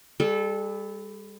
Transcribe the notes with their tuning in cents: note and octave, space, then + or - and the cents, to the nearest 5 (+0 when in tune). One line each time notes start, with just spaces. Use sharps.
G3 +30 A4 -20